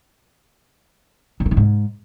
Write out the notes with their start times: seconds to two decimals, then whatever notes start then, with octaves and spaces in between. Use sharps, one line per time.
1.40 D3
1.46 C3
1.51 D#3
1.57 G#2